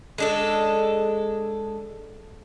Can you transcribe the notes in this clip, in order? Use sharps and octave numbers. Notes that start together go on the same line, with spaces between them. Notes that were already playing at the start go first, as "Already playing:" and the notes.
G#3 D4 A4